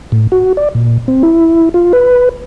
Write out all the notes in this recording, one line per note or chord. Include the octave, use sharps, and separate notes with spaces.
A2
F#4
D5
A#2
C4
E4
F4
B4